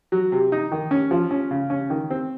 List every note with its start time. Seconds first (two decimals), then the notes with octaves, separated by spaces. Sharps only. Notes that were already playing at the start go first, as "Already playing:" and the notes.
0.12 F#3
0.32 C3
0.52 D#4
0.72 D#3
0.91 C#4
1.11 F3
1.31 C#4
1.51 C#3
1.70 C#4
1.90 D#3
2.10 C4